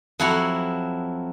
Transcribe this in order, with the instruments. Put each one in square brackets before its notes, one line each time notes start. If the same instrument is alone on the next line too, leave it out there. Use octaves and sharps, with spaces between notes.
[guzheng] F2 F#3 E4 F#4 F#5 A#5